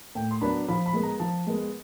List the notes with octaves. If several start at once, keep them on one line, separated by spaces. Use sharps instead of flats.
A2 G5
C6
F#3 B3 D4 B5
F3 B5
B5
G#3 B3
A#5
F3 A5
G#3 B3